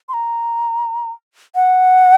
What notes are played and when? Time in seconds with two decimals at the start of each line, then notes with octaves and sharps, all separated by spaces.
0.09 C6
0.13 A#5
1.55 F#5